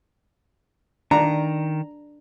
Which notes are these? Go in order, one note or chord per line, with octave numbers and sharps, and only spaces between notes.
D#3 D4 A#5